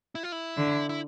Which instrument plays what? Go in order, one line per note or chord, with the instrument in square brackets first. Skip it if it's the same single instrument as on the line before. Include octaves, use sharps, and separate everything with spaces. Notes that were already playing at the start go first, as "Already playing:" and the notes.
[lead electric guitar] E4
F4
E4
[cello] D3
[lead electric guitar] E4